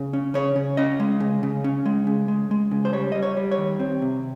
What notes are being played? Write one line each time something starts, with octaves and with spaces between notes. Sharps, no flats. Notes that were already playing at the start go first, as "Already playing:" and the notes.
Already playing: C#3
C#4
C#3 C#5
C#3
C#4 D#5
G#3
C#3
C#3
C#4
G#3
C#3
G#3
G#3
C#3
C5
G3 C#5
G3 D#5
C#5
G3
C#5
D#3
C4
C3